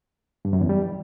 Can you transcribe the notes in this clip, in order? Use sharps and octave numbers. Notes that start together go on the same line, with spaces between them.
G2
F#2
E2
G3